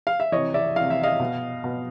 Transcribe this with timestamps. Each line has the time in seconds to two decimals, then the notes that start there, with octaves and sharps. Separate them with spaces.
0.07 F5
0.20 E5
0.32 C3 E3 C#5 D#5
0.54 D5 E5
0.76 C3 E3 F5
0.90 E5
1.03 D#5 F5
1.20 B2
1.64 B2